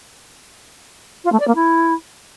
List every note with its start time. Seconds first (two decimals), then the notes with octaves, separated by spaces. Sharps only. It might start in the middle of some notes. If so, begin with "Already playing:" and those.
1.24 F4
1.32 A3
1.40 D5
1.47 A#3
1.55 E4